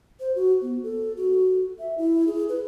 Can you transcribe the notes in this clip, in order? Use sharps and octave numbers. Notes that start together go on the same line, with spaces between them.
C5
F#4
B3
A4
F#4
E5
E4
G#4
B4